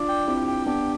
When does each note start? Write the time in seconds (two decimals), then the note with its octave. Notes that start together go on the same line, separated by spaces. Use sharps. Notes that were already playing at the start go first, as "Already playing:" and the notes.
Already playing: D4 F4 D5
0.09 G5
0.28 C4 E4 G4
0.48 G5
0.67 B3 D4 G4